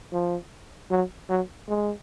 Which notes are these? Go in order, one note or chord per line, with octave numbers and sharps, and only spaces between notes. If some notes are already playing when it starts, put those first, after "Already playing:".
F3
F#3
F#3
G#3